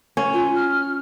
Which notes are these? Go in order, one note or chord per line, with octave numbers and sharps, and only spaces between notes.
C#4
F4
F6